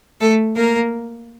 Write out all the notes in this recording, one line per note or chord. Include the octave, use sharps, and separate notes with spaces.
A3 A4
A#3 A#4